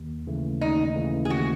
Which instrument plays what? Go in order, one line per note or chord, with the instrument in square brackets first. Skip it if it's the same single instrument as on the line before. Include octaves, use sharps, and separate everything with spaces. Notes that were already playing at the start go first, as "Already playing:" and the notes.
Already playing: [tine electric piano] D#2
C#3 E3 A3
[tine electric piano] D#2 [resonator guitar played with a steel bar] D#4
[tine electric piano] C#3 E3 A3
[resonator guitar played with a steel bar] G#4
[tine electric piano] D#2 [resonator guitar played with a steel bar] F#4